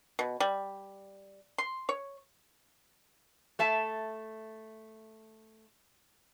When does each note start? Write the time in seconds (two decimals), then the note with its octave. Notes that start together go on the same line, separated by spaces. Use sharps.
0.19 B2
0.40 G3
1.58 C6
1.89 C#5
3.59 A3 E5 A5